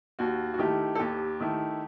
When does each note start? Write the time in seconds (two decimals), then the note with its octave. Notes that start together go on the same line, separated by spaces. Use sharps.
0.19 D#2 F#4
0.54 F#4
0.58 D#3 A3 E4 G4
0.95 A4
0.99 D#2 G4
1.40 D#3 A3 E4